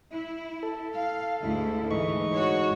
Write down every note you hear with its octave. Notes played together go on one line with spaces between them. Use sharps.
E4
A4
F5
D2 G#2 E4
G#2 E3 D#4 C#6
F#4 C#5